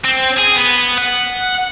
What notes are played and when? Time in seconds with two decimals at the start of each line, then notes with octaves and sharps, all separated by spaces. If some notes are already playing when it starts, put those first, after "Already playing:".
0.04 C4
0.37 G#4
0.55 B3
0.98 F#5